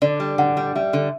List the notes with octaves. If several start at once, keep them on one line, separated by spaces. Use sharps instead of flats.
D3 D5
G3
D3 F#5
G3
G3 E5
D3